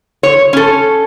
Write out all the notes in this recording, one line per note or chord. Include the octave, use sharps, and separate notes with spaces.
C#5
C#4 A4